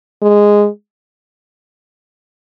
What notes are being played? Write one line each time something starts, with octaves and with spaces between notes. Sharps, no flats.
G#3